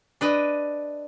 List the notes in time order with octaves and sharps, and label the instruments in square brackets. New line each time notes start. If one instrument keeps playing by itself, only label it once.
[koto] D4 B4 D#5